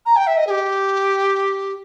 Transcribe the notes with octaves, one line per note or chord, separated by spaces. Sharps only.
A#5
G5
E5
D#5
G#4
G4